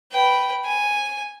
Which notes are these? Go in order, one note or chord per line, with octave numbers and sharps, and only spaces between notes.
B4 G5
G#5